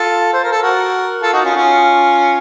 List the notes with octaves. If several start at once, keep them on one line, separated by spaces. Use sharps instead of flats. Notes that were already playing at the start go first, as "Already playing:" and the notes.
Already playing: F4 A4
C5
A#4
A4
F#4 A#4
F4 A4
D#4 F#4
C#4 F4
C#4 F4